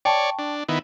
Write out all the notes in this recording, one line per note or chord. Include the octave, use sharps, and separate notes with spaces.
C#5 D5 G5 A5 C#6
D4
D#3 B3 E4